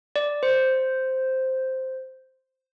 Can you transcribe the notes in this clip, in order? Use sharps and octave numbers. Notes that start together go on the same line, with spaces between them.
D5
C5